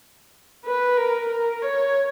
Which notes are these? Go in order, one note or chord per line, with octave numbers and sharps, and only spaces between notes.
B4
A#4
A#4
C#5